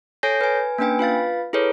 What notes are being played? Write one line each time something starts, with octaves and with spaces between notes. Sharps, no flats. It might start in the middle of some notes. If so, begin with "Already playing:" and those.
A4 C#5 G#5 G6 A#6 C7
B4 G#5
A#3 C#4 D4 B4 G5 G#5
F4 B4 F5 A6
E4 G#4 A4 B4 C#5